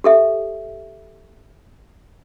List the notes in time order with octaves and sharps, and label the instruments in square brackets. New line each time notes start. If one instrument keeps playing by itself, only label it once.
[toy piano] G4 A4 E5